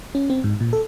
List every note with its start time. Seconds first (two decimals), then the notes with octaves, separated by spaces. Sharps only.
0.15 C#4
0.30 C4
0.44 G#2
0.60 A#2
0.73 A4